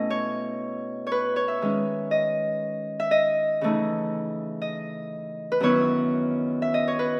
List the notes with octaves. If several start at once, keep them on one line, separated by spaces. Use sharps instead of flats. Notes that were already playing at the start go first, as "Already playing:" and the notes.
Already playing: B2 A3 C#4 E4 D#5
C#5
C#5
B4
C#5
E5
D#3 G#3 C#4
D#5
E5
D#5
C#3 E3 A3 D#4
D#5
B4
F#2 D#3 F#3 B3 E4 C#5
E5
D#5
C#5
B4